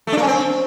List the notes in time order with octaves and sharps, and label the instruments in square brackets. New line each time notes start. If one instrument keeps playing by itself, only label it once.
[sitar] A3
D4
A#3
C#4
C4